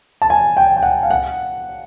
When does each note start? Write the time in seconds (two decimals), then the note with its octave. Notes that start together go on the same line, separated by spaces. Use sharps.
0.22 A5
0.30 G#5
0.57 G5
0.77 G5
0.83 F#5
1.03 F5
1.10 F#5